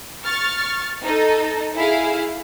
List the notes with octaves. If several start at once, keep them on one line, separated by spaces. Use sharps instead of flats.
C#6 F6 A6
D#4 A4
E4 G#4 F5